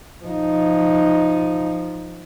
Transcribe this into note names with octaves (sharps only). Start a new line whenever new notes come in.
F3 D#4